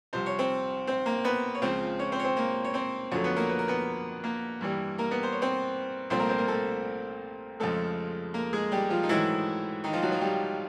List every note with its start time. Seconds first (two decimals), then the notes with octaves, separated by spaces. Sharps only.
0.13 C2 C3 F3 C5
0.26 C#5
0.39 C4 C5
0.87 C4 C5
1.06 A#3 A#4
1.24 B3 B4
1.55 C#5
1.62 C#2 C#3 F3 C4 C5
1.99 C#4 C#5
2.12 C4 C5
2.19 C#5
2.24 C4 C5
2.36 A#3 A#4
2.64 C#5
2.74 C4 C5
3.11 F2 D3 F#3 A3 C#4 C#5
3.24 B3 B4
3.36 A#3 A#4
3.49 B4
3.59 A#4
3.68 B3 B4
4.24 A#3 A#4
4.61 G2 E3 G3
4.98 A#3 A#4
5.11 B3 B4
5.23 C5
5.32 C#5
5.42 C4 C5
6.10 C2 A#2 F3 A3 C4 C5
6.19 A#3 A#4
6.29 C4 C5
6.38 A#3 A#4
6.48 A3 A4
7.60 F2 C#3 F3 G#3 A3 A4
8.34 A#3 A#4
8.53 G#3 G#4
8.72 G3 G4
8.90 F3 F4
9.03 D#4
9.09 G#2 D#3 E3 F#3 A3 E4
9.84 D#3 D#4
9.93 F3 F4
10.03 F#3 F#4
10.12 F3 F4
10.21 G3 G4